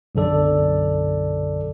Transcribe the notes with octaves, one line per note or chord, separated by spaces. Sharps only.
B1 F#2 D3 A4 D5